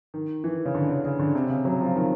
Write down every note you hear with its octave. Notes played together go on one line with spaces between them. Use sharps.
D#3
E3
C#3
D3
C#3
C#3
D3
C3
C#3
F#3
F3
D#3